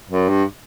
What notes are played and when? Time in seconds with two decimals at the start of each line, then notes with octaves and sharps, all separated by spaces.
0.09 F#2
0.28 G2